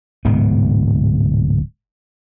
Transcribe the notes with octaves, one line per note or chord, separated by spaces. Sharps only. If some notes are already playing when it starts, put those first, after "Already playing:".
D1 G#2 C3 B3